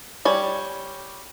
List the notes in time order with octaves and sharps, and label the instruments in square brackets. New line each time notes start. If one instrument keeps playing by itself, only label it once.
[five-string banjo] G3 C#5